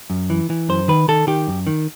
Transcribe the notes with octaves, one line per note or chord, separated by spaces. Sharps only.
F#2
E3
E3
F#2 C5
D#3 B4
D#3 A4
D#3 G4
F#2
D#3